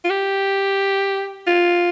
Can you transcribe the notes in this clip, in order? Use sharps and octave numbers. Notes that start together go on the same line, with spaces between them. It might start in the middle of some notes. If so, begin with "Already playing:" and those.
F4
G4
F4